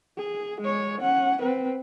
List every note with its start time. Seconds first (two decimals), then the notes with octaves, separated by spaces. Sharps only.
0.18 G#4
0.61 G#3 C#5
1.01 C#4 F#5
1.42 C4 B4